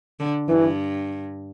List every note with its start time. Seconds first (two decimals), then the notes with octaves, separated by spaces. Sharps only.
0.20 D3
0.48 G2 E3